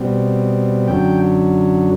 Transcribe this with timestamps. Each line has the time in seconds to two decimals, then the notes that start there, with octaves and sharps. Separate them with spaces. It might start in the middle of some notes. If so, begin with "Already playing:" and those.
Already playing: B2 G3 C4
0.88 F#2 D3 F#3 G5